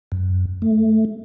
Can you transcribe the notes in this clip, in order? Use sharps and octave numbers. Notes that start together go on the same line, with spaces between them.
F#2
A3